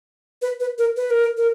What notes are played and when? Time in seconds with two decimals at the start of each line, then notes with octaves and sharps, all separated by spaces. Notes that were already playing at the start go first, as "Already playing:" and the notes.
0.42 B4
0.60 B4
0.78 A#4
0.97 B4
1.10 A#4
1.37 A#4